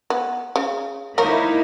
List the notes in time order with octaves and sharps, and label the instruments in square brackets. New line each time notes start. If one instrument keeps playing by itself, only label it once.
[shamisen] B3
C#3
[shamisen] F3 A#4 C#5 [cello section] A#3 D#4 E4